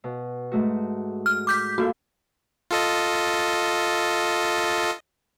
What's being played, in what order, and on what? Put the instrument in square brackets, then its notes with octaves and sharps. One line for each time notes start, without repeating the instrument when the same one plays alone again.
[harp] B2
G#2 A3 F#4
[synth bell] F6
D6 G6 B6
[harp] A#3 F4 A4 [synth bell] F#4
[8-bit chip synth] F4 A4 D#5